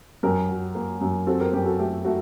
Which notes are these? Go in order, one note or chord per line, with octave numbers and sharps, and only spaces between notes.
F#2 G4 A#4
F#3
A#3
F#2
C4 F#4 A4
G4 A#4
F#2 G4 A#4
F#4 A4
A3 G4
A3 F#4